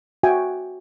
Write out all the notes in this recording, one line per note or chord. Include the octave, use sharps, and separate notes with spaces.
F#4 E5 G5 G#5